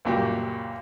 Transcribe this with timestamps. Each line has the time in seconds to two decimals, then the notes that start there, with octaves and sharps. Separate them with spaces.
0.05 C#2 F#2 A#2 G3 G4